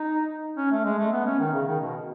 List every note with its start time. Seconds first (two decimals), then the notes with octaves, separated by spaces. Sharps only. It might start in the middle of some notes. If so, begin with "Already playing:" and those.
Already playing: D#4
0.57 C#4
0.71 A3
0.85 G#3
0.98 A3
1.12 B3
1.26 C#4
1.40 D#3
1.54 C#3
1.67 D#3
1.80 B2